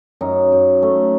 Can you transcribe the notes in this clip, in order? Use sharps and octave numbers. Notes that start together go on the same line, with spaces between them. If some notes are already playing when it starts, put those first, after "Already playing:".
F#2 D#4
F#2
A3